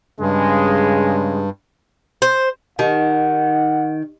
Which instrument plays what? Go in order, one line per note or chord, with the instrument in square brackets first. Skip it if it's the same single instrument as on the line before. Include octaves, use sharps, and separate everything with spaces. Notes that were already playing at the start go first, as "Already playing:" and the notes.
[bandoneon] G2 [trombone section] C#3 G#3
[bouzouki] C5
[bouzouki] D#3 [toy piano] D#4 G4 D#5 [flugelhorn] F#5